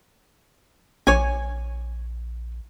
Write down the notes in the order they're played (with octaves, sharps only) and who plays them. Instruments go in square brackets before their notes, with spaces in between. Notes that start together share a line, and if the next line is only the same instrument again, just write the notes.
[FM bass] A#1 [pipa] C#5 G#5